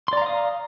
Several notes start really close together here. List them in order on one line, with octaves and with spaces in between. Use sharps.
C6 D5 A#5 F5 D#6